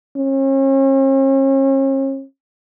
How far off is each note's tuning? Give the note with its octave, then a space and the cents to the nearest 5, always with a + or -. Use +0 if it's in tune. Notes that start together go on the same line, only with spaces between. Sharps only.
C#4 -40